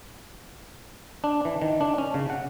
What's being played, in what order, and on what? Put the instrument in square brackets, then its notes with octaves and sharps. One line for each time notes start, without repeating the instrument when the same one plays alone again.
[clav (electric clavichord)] D4
E3
D#3
D4
C#4
C#3
F#5